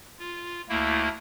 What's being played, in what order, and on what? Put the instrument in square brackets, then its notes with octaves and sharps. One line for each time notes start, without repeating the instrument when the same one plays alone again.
[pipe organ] F4
D2 A3 A#3 E4